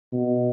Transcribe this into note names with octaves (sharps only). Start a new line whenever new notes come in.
B2